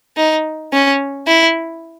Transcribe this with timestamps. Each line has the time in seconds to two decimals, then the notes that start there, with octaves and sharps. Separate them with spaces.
0.17 D#4
0.73 C#4
1.28 E4